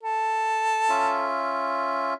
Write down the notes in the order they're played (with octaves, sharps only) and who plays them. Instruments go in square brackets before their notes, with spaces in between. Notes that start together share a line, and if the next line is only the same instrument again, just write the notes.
[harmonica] A4
[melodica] C#4 F4 E5